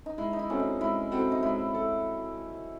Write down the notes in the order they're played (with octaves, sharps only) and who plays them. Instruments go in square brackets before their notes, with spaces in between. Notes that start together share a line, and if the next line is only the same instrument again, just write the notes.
[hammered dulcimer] D#4
[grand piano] G#3 [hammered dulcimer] E4
[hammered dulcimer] D#4
E4
[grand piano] C4 F#4 A4 [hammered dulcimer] C#4
[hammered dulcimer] D#4
[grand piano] G#3 [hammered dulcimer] E4
[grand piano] C4 F#4 A4
[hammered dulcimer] D#4
[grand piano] G#3 [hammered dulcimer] E4
[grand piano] A4